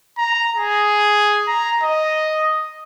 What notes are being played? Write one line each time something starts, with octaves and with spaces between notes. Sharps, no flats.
A#5
G#4
A#5
D#5